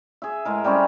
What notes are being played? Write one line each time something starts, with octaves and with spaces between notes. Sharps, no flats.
G#4 E5
A2 G#3 A#4
G3 C4 C#4 G4